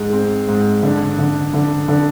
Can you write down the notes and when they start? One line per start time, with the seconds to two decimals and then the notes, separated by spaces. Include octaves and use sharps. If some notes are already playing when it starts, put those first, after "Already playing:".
Already playing: G#2 G#3
0.13 C4
0.48 G#2
0.83 D3
1.18 D3
1.54 D3
1.88 D3